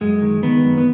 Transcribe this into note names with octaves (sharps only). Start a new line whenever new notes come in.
F#2 G#3
D#3
D#3 B3
F#2
B3